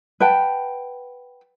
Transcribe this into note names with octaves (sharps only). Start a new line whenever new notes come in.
B4 F#5 G5 A5